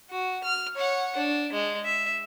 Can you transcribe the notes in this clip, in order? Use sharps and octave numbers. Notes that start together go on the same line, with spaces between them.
F#4
F6
C#5 F#5
D4
G#3
E5